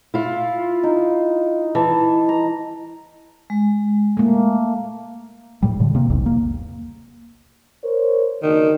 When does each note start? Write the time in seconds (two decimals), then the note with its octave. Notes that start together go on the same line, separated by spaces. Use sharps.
0.14 E4 F4
0.83 D#4
1.75 E3 A5
2.29 A#5
3.50 G#3
4.17 A3 A#3
5.63 A2 G3
5.80 A2 D3
5.95 C3 A#3
6.10 B1 E2
6.26 A#3
7.84 A#4 C5 C#5
8.43 F#1 D#3 D4